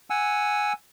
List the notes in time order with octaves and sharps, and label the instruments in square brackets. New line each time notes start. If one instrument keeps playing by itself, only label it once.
[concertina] F#5 G#5 E6